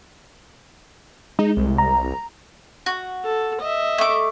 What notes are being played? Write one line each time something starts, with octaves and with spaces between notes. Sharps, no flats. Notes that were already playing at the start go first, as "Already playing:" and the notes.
G#3 D#4
C2
A#5
F#4
A4
D#5 E5
A3 D6